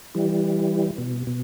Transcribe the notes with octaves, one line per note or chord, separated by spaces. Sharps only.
E3 G3
B2
B2